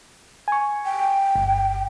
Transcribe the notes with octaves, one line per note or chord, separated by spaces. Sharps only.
G#5 C#6
G5
G1